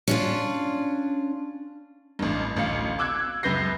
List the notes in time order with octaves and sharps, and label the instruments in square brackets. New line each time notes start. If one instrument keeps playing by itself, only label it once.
[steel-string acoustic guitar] C#4 D4 F4
[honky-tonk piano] A1 G2
A1 D2 F5 C#7
D6 E6 F#6 G#6
C#2 F#2 B4 G6 A#6 C7